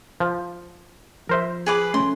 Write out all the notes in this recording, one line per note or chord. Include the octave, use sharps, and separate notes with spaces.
F3
F3 A#4 C5 E5
G#4 B4 D6
A3 C#4 C6